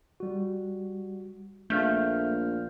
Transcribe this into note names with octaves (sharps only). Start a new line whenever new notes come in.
G3 F#4
A#1 A3 F5 F6 G6